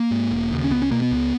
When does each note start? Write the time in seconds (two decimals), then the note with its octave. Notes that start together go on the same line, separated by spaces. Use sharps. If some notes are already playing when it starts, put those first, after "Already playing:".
Already playing: A#3
0.11 G#2
0.31 E1
0.52 D#2 C#3
0.64 C#4
0.71 C#2 B3
0.82 C#4
0.91 B2 A#3
1.02 B3
1.11 C#2